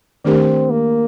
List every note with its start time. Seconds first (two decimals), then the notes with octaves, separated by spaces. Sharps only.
0.25 D#3 A3 C4 D4 G4 A#4
0.70 A#3